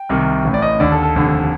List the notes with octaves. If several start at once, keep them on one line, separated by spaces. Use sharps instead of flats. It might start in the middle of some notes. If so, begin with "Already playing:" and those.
Already playing: G5
C2 C3 D#3
A1 A2
D5
D#5
D#2 D3 D5
A4
A4
F1 D#2 D3